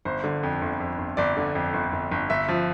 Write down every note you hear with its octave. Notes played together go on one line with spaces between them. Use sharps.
G1 C5
D3
F2
G1
F2
G1
G1 D5
D3
F2
G1
G1
G1
G1 E5
F3